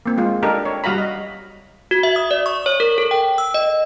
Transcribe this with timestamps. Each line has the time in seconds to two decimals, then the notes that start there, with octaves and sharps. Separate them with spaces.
0.06 A#3 C4
0.18 G#3 F4
0.43 D4 D#4 G4 A4 A#4
0.65 C#5
0.84 G3 F#4 F5 A#5 B5
0.98 D#5
1.91 F#4
2.03 E5
2.16 D#6
2.31 D5
2.46 C#6
2.66 C#5
2.80 A#4
2.98 A4
3.11 G5
3.38 E6
3.54 D#5